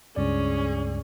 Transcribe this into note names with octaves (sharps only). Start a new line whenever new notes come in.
C#2 G2 C#4 G#4 D5